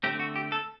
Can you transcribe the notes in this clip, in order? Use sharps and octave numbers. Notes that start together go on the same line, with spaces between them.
D3 A3 C4 G4
F#4
G4
A4